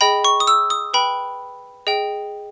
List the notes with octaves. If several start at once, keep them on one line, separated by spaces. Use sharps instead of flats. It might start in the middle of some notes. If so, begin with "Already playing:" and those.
G#4 D#5 G5 B5
C#6
D#6
E6
D#6
B4 G5 B5
G#4 D#5 G5